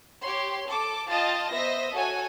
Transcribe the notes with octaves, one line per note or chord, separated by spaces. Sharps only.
G4 C#5 C6
A4 D6
F4 D#5 G5 A5 A6
B3 C5 D#5 E5 A#6
F#4 A4 C#5 G#5